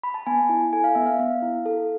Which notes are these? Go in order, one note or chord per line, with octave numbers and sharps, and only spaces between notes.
B5
A5
B3 G#5
E4
A4 G#5
F5
B3 E5
F5
B3 F5
E4
A4